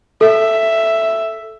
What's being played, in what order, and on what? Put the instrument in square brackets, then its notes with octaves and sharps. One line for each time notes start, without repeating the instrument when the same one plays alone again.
[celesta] A4 [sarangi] E5